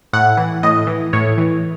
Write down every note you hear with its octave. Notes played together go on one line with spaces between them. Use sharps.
A2 F#5
E3
A2 D#5
E3
A2 C#5
E3